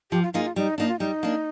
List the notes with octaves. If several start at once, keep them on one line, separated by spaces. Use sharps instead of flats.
F3 G4
F4
A#3 D#4 F4 G#4
F4
G3 D#4
A#3 D4 D#4
F4
G3 D#4
A#3 D4